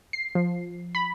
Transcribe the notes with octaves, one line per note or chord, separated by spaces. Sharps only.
C7
F3
B5